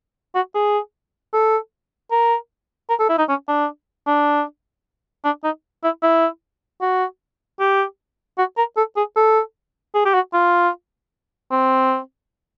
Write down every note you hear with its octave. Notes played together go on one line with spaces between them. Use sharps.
F#4
G#4
A4
A#4
A#4
A4
E4
D#4
C#4
D4
D4
D4
D#4
E4
E4
F#4
G4
F#4
A#4
A4
G#4
A4
G#4
G4
F#4
F4
C4